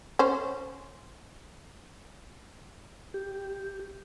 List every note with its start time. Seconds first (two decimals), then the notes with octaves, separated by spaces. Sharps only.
0.19 C#4 C5
3.14 G4